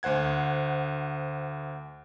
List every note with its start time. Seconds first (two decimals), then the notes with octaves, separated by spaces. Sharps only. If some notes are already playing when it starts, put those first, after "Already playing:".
0.03 D2 C5 F#5 G#6